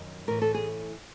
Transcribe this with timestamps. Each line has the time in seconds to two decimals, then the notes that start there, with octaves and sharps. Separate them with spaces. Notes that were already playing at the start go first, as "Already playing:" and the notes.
Already playing: F#2 D#3
0.27 A2 E3 A#4
0.42 A4
0.54 G#4